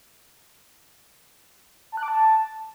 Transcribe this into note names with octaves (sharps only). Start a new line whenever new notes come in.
A5
F#6
D6
A5